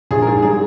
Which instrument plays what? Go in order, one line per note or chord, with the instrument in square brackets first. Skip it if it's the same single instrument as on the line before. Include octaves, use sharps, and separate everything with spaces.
[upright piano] A#1 G#4
A#4
G#2 G#4
G3 G#4